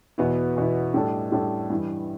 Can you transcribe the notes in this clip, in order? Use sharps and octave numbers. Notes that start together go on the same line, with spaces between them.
E2 B2 B3 E4
E2 B2 B3 E4
A2 G3 D4 A4
A2 G3 D4 A4
G2 E3 G3 E4